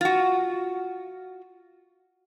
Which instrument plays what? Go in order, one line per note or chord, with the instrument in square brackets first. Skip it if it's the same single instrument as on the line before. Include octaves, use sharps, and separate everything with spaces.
[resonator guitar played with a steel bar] F4 F#4